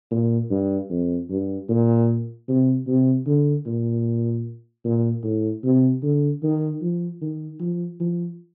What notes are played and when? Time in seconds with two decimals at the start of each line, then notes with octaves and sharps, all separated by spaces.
0.11 A#2
0.51 G2
0.90 F2
1.30 G2
1.69 A#2
2.48 C3
2.87 C3
3.27 D3
3.66 A#2
4.84 A#2
5.23 A2
5.63 C3
6.02 D3
6.42 D#3
6.82 F3
7.21 D#3
7.60 F3
8.00 F3